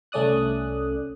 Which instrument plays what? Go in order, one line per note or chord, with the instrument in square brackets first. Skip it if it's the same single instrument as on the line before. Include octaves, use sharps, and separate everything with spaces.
[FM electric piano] C2 A3 C#4 D5 D#6 F#6